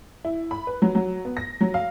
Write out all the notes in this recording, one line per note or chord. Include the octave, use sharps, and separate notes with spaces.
E4
B5
B4
F#3
F#3
B3
A#6
F#3
F5